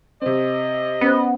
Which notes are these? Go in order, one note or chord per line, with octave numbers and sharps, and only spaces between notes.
C3 C4 D#5
B3 C#4 C5